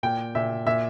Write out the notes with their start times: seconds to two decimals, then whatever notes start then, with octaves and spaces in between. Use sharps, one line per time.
0.03 A#2 G5
0.35 A#2 E5
0.66 A#2 E5